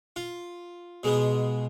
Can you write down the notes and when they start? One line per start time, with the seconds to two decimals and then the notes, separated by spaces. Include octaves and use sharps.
0.16 F4
1.03 B2 G#3 B3